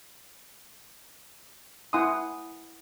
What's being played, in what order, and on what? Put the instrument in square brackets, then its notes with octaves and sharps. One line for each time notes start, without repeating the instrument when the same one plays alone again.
[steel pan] E4 F#5 G#5 C6 D#6